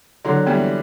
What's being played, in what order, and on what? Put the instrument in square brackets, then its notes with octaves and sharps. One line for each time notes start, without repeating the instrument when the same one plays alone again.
[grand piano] D3 F#3 [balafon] E4
[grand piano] E3 G3 [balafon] B3